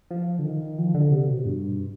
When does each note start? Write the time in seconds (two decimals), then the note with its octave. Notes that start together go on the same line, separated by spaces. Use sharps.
0.11 F3
0.39 D3
0.44 D#3
0.78 F3
0.95 D3
1.11 C3
1.29 B2
1.45 G2